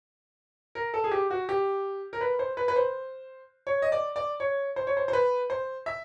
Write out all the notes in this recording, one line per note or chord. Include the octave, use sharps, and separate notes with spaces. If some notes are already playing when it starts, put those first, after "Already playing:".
A#4
A4
G#4
G4
F#4
G4
A#4
B4
C5
B4
B4
C5
C#5
D#5
D5
D5
C#5
C5
C#5
C5
C5
B4
C5
E5